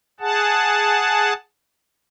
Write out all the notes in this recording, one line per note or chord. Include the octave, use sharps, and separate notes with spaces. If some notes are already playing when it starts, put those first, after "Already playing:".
G#4 F#5 A5